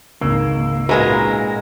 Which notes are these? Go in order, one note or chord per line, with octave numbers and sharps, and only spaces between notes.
G#1 C#2 C#3 A#3 E6
A#2 G#3 F#4 A#4 B4